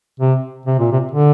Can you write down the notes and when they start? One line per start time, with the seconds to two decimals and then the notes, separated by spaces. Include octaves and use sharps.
0.20 C3
0.66 C3
0.79 A#2
0.92 C3
1.12 D3